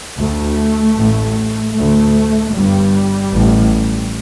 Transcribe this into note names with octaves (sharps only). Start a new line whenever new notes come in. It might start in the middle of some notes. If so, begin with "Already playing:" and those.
D2 A3
A1 A2
D2 A3
G1 G2 G3
A1 A2